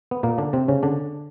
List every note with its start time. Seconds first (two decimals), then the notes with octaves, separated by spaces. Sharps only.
0.11 B3
0.23 A#2 A#3
0.38 D3 D4
0.53 C3 C4
0.68 C#3 C#4
0.83 D3 D4